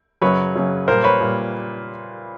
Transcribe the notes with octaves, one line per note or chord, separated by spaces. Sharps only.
F#2 C#3 F#3 B4 C#5
F#2 C#3 F#3
A#2 G3 A#4 C5
B4 C#5
A#2 G3